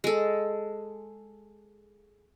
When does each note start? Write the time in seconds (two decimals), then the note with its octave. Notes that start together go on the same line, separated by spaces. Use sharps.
0.04 G#3 A4